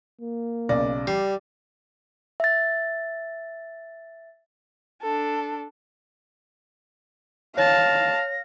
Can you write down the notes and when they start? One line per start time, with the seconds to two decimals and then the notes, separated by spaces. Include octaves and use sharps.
0.21 A#3
0.69 B1 C#3 D5 A#6
1.07 G3 C7
2.40 E5 A6
5.02 D4 A4
7.58 C#5 F5 A5 A#6